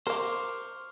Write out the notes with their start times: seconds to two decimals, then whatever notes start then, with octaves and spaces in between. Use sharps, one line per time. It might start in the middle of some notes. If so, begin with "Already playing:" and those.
0.07 A#4 C5 F5 C#6 D6 F6